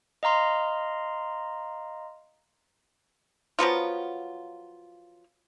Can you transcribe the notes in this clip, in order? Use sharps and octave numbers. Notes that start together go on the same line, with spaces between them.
D#5 F5 A#5 C6
F3 F#3 B3 F4